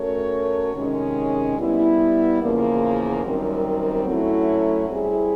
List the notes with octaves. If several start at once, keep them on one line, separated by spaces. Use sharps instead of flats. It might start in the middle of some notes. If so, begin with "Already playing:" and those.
Already playing: A3 C#4 F#4 A#4 C#5
C3 D#3 G#3 C#4
G3 B3 E4
E2 C#3 F3 A#3
F#2 D#3 G3 C4
F#3 A3 C#4 E4 A4
G3 C4 E4 G#4